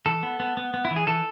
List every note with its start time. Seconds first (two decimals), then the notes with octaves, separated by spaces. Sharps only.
0.06 E3 A4
0.23 B3
0.40 B3
0.57 B3
0.74 B3
0.85 E4
0.91 E3
0.96 G#4
1.07 E3 A4